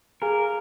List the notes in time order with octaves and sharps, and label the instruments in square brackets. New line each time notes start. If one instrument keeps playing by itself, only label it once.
[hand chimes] G#4 F5 G#5 [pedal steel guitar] A#4